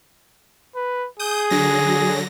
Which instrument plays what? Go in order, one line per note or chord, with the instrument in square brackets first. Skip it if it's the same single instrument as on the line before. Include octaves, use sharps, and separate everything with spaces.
[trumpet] B4
[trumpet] G#4 [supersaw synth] D#6 G6
[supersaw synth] D3 F#3 A#6